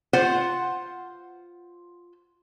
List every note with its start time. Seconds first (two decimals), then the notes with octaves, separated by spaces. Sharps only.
0.13 F4 C5 F#5